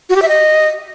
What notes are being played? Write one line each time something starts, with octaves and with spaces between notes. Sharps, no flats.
F#4
G4
E5
D#5